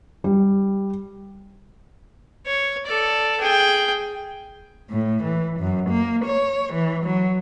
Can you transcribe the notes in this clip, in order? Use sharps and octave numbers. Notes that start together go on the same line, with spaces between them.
G3
C#5
A4 D5
G#4 G5
A2
E3
F#2
A#3
C#5
E3
F#3